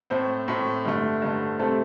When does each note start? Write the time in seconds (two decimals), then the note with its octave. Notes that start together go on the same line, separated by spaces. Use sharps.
0.10 A2 A3 C4 C5
0.48 A2 A3 C4
0.85 G2 D3 A3
1.22 G2 D3 A3
1.59 C3 G3 A3 C4 A4